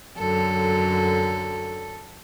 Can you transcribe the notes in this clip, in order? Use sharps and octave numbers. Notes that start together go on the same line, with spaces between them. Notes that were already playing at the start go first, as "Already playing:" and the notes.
F#2 D3 F#3 A4